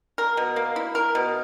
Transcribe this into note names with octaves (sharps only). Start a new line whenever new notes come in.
A#4
B2
A#3
E4
A#4
B2